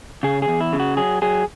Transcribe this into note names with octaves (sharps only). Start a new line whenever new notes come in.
C#3 G#4
G#4
E2
E4
C#3
F#4
F#3 G#4
F#3 G#4